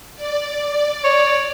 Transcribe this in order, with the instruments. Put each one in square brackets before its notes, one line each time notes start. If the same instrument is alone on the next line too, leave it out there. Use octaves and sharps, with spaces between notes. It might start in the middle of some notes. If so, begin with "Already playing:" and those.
[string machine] D5
[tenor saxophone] C#5